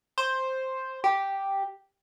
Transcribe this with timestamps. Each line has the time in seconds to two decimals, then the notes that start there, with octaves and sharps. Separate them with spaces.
0.18 C5
1.04 G4